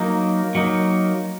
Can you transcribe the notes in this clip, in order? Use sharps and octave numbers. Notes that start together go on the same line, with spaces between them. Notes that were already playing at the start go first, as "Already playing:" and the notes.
Already playing: F#3 A#3 D#4
F#3 A#3 D#4